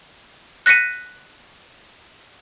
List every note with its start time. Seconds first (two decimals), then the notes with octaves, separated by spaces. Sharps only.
0.66 F#6 A#6 B6 C#7 D#7